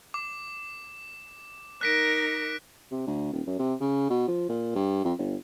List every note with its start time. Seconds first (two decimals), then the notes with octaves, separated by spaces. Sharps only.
0.14 D6
1.81 D#4 A#4 F#6 B6 D7
2.91 C3
3.07 D2
3.33 D#1
3.47 F#2
3.59 C3
3.81 C#3
4.10 B2
4.28 F3
4.49 A#2
4.75 G2
5.05 F2
5.19 G1